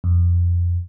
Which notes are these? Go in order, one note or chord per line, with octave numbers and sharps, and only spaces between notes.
F2